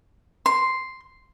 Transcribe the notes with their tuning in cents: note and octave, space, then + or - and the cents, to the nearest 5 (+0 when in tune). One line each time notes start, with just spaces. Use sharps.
C6 +0